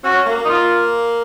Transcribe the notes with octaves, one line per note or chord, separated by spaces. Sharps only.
C#4 F#4
A#3
D#4
F4